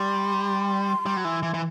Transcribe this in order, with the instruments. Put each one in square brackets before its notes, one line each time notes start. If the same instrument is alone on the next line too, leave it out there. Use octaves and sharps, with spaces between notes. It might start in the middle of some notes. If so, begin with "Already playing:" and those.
Already playing: [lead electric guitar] G3 [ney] C6
[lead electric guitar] G3
F#3
E3
E3
E3